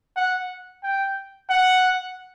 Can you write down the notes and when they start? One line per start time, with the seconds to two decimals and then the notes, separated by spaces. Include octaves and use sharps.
0.16 F#5
0.84 G5
1.50 F#5